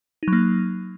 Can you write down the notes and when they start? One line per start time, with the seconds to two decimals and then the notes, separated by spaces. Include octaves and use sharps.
0.23 D#4
0.28 F#3
0.33 A#3